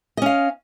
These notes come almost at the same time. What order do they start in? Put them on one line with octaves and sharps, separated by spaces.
D#5 C#4 F5